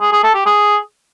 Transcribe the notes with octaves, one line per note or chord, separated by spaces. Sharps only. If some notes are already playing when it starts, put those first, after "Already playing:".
G#4
G#4
A4
G4
G#4